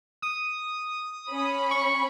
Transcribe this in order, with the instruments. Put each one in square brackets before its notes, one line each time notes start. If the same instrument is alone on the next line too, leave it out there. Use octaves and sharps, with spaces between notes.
[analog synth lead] D#6
[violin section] C#4 B5
[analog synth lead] C#6